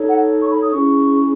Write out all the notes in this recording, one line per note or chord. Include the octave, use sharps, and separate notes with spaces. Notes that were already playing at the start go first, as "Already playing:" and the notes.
Already playing: D#4 A4 C#5
F#5
C#6
B5
D#6
C#4 E4 G#4 C#6